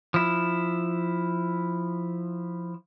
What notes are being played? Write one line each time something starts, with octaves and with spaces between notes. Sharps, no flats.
F3 E4